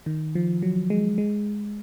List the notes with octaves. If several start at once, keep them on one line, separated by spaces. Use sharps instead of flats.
D#3
F3
F#3
G#3
G#3